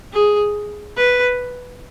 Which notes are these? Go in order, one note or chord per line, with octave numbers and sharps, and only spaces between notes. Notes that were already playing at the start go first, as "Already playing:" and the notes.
G#4
B4